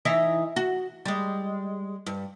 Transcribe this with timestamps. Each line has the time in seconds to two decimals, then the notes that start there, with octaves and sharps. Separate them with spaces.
0.05 E3 D#4 E5
0.56 F#4
1.05 G3 G#3
2.06 G2